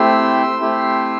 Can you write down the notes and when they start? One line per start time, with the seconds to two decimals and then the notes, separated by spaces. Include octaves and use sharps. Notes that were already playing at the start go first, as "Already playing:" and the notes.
Already playing: A3 C4 E4 G4 C6 E6
0.61 A3 C4 E4 G4